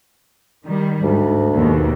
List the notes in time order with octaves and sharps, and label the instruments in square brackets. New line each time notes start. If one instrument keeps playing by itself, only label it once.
[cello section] D#3 G3
[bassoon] D2 [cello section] G#2
[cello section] D#2 B2